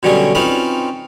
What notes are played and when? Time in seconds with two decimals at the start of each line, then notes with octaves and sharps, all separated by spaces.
0.03 B2 D3 F#3 G3 C#4 G#4
0.35 C4 C#4 D#4 F4 B4 B5